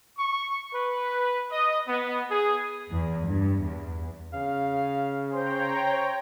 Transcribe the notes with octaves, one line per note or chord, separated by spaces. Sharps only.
C#6
B4
D#5
B3
G#4
E2
G2
E2
C#3 F5
C5 C#5 G5 A#5 C6